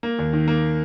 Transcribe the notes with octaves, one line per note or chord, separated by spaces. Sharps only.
A#3
D#2
D#3
A#3